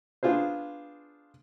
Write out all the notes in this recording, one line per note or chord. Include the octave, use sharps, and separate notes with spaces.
B3 D4 F4 G#4 C5